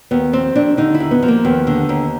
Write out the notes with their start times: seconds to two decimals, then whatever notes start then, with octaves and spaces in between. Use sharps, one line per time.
0.11 D#2 B3
0.33 F3 C4
0.56 D#2 D4
0.77 D3 D#4
0.94 E4
1.00 D#2
1.11 B3
1.23 F3
1.28 A#3
1.45 D#2 B3
1.67 D3
1.89 D#2